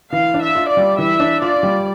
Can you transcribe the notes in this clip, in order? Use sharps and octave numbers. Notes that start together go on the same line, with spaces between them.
E3 F5
D4
E5
F4
D5
G3
E3 E5
D4
F4 D5
G3